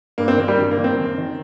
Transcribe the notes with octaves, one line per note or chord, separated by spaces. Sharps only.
G2 A#3
C4
D#3 A#3
G3
G2
A#3
D#3
C4
F#2
D#3